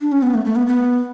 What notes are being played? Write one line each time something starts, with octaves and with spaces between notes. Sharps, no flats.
D4
C#4
B3
A3
A3
B3
B3